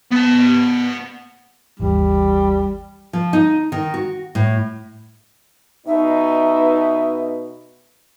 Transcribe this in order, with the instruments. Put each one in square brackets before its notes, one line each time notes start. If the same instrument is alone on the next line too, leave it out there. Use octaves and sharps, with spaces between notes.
[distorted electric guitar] B3 A5
[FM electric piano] G#1 D#2 E3 [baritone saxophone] G3
[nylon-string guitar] F3
D#4
D#3
F#4
A2
[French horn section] B2 D#4 [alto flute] E5